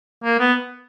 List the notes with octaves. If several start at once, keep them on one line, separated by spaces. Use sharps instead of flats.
A#3
B3